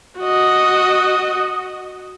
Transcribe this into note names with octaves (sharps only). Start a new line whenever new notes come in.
F#4 D#5